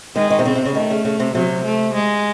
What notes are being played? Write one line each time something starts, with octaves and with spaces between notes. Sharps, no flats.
D#3 G#3
D#3
C3
C#3 C4
C3
C#3
D#3 A3
C#3
C#3
C3
C3 F#3
A3
G#3